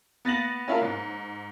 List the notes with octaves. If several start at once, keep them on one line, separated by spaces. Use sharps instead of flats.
B3 A6 A#6 F#7
C#4 E4 F4 A#4
G#2